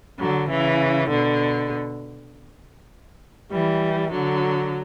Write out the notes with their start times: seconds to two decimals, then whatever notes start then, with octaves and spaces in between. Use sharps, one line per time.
0.19 D3 F#3
0.49 C#3 E3
1.09 B2 D3
3.51 E3 G3
4.11 D3 F#3